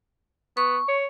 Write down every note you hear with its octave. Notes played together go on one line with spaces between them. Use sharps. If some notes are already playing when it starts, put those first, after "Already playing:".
B3 C#6
C#5